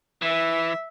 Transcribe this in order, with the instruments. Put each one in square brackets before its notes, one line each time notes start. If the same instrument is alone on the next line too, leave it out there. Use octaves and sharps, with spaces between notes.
[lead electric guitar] E3 [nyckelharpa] E5